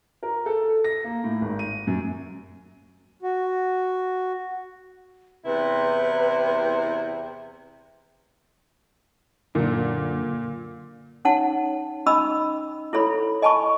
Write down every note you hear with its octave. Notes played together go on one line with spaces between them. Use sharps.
A#4
A4
A#6
A#3
A2
G#1
D#7
F#2
F#4
E2 C3 E4 B4
F#2 A#2 D3
C#4 D#4 C#5 F#5 A5
C#4 D#4 D#5 B5 E6
E4 A4 C#5 B5
D#5 G#5 A5 B5 C#6